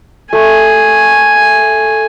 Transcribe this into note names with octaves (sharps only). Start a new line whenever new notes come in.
A3 G#5